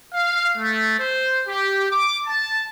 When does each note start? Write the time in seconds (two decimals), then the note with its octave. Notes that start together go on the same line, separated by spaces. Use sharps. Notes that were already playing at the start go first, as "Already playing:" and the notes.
0.14 F5
0.57 A3
0.98 C5
1.48 G4
1.91 D6
2.26 A5